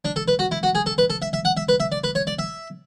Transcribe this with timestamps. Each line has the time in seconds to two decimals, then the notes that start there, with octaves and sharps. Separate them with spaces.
0.05 D4
0.16 A4
0.28 B4
0.39 F#4
0.51 E4
0.63 F#4
0.75 G#4
0.86 A4
0.98 B4
1.10 A4
1.22 E5
1.33 E5
1.45 F#5
1.57 E5
1.69 B4
1.80 E5
1.92 D5
2.04 B4
2.15 C#5
2.27 D5
2.39 E5